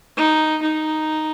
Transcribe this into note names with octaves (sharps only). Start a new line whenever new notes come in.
D#4
D#4